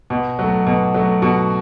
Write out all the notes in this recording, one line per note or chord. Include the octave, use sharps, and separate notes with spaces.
B2
F#3 A3
B2
F#3 A3
B2 F#4